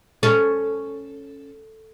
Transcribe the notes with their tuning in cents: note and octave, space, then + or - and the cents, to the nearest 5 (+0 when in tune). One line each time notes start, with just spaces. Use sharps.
C#4 +0 A4 +0